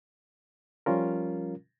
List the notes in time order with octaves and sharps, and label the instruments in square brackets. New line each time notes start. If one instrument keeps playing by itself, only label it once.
[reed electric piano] F3 G3 C#4 F4 A#4